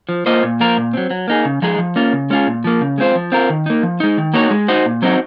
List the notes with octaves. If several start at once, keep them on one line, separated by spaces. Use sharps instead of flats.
F3
A#3 F4 C5 D#5
A#2
F3 A#3 F4 A#4
A#2
F#3 C4
F#3
A#3 D#4 G#4
C#3
F3 G#3 D#4 G#4
F3
A#3 C#4 F4
C#3
G#3 C#4 F4 G#4
A#2
F3 A#3
C#3
G#3 C4 F4 C5
F3
C4 F4 A#4
D#3
A#3 D#4
F3
G#3 D#4
D#3
A#3 D#4 F#4 C#5
G#3
D#4 F#4 C5 D#5
A#2
F#3 C4 D#4 F#4